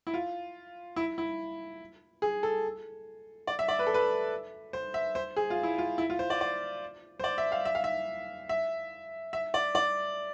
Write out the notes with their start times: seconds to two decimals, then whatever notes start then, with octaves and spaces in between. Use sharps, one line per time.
0.07 E4
0.14 F4
0.96 E4
1.18 E4
2.22 G#4
2.43 A4
3.47 D5
3.59 E5
3.68 D5
3.79 B4
3.87 A4
3.94 B4
4.73 C5
4.94 E5
5.15 C5
5.36 G#4
5.50 F4
5.63 E4
5.78 F4
5.98 E4
6.10 F4
6.19 C5
6.30 D5
6.41 D5
7.20 C5
7.24 D5
7.38 E5
7.52 F5
7.65 E5
7.75 F5
7.84 E5
8.49 E5
9.33 E5
9.54 D5
9.75 D5